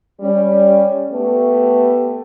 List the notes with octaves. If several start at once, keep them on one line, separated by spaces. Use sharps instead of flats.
G3 C#4
A3 B3 G4